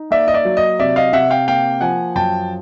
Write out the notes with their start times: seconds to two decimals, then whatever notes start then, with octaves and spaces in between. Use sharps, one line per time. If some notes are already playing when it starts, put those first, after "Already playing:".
Already playing: D#4
0.11 A#3 D5 E5
0.28 D#5
0.34 D5 E5
0.45 F#3
0.57 D#5
0.79 C3 D5 E5
0.96 D#5 F5
1.13 C3 E5 F#5
1.30 F5 G5
1.47 A#3 F5 G5
1.81 F3 F#5 G#5
2.15 F#2 G5 A5